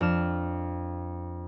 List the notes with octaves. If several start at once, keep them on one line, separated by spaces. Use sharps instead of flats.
F2 D4 F6 E7